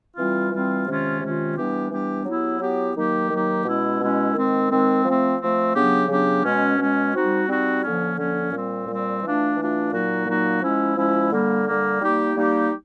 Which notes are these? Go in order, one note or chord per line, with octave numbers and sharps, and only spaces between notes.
E3 G3 C4 F4
E3 G3 C4 F4
C3 D#3 G#3 C#4 F4
C3 D#3 G#3 C#4 F4
E3 G3 B3 D4 G4
E3 G3 B3 D4 G4
F#3 B3 E4 G4
F#3 B3 E4 G4
D#3 F#3 A#3 D#4 G4
D#3 F#3 A#3 D#4 G4
B2 G#3 C#4 E4
B2 G#3 C#4 E4
D#3 G#3 C4
D#3 G#3 C4
F3 A3 C4
F3 A3 C4
C#3 F#3 B3 D4 G4
C#3 F#3 B3 D4 G4
B2 G#3 C#4
B2 G#3 C#4
G3 C4 D#4 F#4
G3 C4 D#4 F#4
D3 F3 A#3 C#4
D3 F3 A#3 C#4
A#2 G3 C4
A#2 G3 C4
E3 A3 D4 F4
E3 A3 D4 F4
A#2 F#3 A#3 D#4 F#4
A#2 F#3 A#3 D#4 F#4
F3 G#3 C#4 E4
F3 G#3 C#4 E4
D3 G3 A#3
D3 G3 A#3
G3 A#3 D#4 G4
G3 A#3 D#4 G4